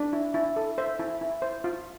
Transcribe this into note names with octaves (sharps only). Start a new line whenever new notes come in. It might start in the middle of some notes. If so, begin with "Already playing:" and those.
Already playing: D4
E4
E4
A4
C5 E5
E4
E4
C5
F4